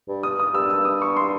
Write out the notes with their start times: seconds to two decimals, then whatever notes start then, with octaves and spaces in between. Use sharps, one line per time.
0.08 G2
0.23 D#6
0.40 D#6
0.54 G2 E6
0.70 E6
0.85 D#6
1.02 C#6
1.17 C6